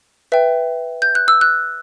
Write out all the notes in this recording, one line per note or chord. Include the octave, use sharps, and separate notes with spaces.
B4 E5 G5
G6
F#6
E6
F#6